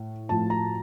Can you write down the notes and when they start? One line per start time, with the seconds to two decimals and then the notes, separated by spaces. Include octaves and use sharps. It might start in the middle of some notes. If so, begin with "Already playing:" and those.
Already playing: A2
0.29 A2 F3 A5
0.50 A#5